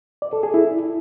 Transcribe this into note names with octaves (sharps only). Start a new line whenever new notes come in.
D5
A4
G#4
E4